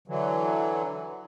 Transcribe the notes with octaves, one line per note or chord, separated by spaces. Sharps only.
D3 E3 F#3